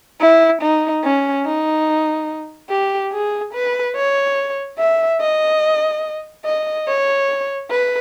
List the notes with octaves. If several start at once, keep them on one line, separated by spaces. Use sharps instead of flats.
E4
D#4
C#4
D#4
G4
G#4
B4
C#5
E5
D#5
D#5
C#5
B4